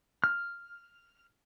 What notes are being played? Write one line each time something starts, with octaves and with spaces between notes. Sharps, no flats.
F6